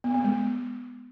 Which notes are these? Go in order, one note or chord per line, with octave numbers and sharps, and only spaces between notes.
B3
B3
G#3